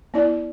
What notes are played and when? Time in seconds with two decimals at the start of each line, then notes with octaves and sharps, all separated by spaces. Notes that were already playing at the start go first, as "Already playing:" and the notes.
0.14 B3 E4 D5